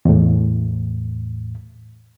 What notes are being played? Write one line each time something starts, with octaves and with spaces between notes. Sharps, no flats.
E2 A2